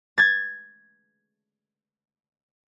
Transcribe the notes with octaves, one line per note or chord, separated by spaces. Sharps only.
G#6 A6